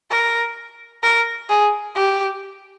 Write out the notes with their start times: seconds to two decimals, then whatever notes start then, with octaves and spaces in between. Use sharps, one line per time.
0.11 A#4
1.03 A#4
1.49 G#4
1.96 G4